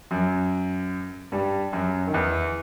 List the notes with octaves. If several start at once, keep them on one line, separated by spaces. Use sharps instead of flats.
F#2 F#3
G2 G3
F#2 F#3
D#3
E2 E3